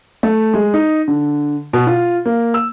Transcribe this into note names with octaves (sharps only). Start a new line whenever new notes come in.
A3
G#3
D#4
D3
B2
F4
A#3
E6